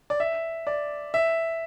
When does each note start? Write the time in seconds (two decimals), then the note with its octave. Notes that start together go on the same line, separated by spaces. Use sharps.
0.10 D5
0.20 E5
0.67 D5
1.14 E5